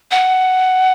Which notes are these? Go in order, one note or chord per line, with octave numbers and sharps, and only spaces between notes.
F#5